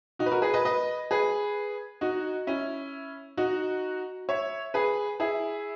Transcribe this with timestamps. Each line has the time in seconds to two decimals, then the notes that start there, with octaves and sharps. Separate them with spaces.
0.19 D#4 F#4
0.26 B4
0.31 F#4 A#4
0.42 G#4 B4
0.54 B4 D#5
0.65 B4 D#5
1.11 G#4 B4
2.01 D#4 F#4
2.47 C#4 E4
3.37 D#4 F#4
4.29 C#5 E5
4.74 G#4 B4
5.20 E4 G#4